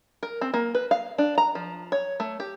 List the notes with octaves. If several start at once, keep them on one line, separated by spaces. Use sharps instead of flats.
A#4
C4
A#3
B4
F5
D4
A#5
F3
C#5
A3
G4